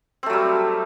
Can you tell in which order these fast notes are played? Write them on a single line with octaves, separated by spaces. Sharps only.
C4 A3 F#3 G3